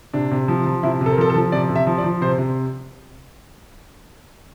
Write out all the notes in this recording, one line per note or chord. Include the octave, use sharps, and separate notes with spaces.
C3 D4
C3
F3
F3
C3 E4
C3
A4
A#4
F3 A4
A4
F3
C3 D5
C3
E5
F3
D5
F3
C3 C5
C3